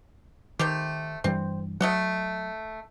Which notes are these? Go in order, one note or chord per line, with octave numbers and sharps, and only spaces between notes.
D#3 A3 C4 G4
G2 E3 G3 C4
F#3 A3 D#5 F#5